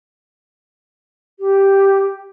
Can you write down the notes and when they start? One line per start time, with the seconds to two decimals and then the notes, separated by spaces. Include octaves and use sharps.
1.39 G4